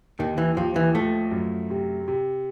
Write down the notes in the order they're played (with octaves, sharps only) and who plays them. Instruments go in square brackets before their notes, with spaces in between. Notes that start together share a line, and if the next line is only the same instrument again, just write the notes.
[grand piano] D#2 [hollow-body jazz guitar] D#3
[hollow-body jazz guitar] E3
[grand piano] D#2 [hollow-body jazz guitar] F3
[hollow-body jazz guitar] E3
[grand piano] F3 [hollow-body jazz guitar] A3
[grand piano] F#2
C3
C3